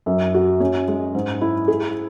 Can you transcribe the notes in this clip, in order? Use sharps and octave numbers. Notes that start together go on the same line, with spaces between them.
F#2
F#4
C#4
G#3
G#2
E4
G#4